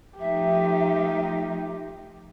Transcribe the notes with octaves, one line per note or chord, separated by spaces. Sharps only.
F3 A3 D#4 G4 E5